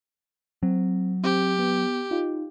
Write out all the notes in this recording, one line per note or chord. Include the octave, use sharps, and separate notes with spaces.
F#3 C4
C4 G4
B3
D#4 F4